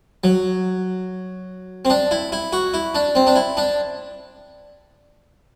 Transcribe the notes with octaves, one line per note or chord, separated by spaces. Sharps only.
F#3
C4
D4
E4
E4
F#4
E4
D4
C4
D4
E4
D4